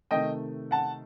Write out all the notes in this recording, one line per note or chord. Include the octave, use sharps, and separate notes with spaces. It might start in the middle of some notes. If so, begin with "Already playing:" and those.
C3 D#3 A3 D#5 G5
F#5 A5